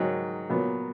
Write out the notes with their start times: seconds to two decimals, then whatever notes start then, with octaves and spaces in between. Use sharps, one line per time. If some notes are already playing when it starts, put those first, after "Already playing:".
Already playing: G#2 D#3 F#3
0.49 A#2 F#3 B3